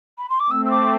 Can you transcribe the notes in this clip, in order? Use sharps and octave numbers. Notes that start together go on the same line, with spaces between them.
B5
C6
D6
A3 C4 E6
E6
D6